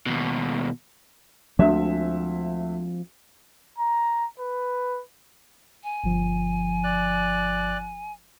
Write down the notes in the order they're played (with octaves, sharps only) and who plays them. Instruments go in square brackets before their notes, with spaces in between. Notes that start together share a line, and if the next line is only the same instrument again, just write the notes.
[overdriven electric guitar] D#2 B2
[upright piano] D2 E5 [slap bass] F3 G#3 C4
[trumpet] A#5
B4
[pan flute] G#5
[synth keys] G1 F3
[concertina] D5 F#6